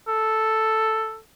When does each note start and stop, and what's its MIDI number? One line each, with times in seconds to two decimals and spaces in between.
0.08 1.19 69